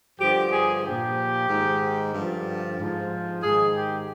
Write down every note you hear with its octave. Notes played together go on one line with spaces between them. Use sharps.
G2 D3 F3 G4
G#4
A#2 F3 G4
G#2 D#3
G2 D3 F3
G#2 F3
G#2 D#3 G#4
G4